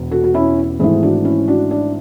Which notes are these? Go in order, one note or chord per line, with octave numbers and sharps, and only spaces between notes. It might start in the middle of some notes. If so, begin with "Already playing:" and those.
Already playing: E1 E2
F#4 A4
F#4
C#4 E4
G#1 G#2 E3 A3 E4 G#4
D4 F#4
C#4 E4
D4 F#4
D4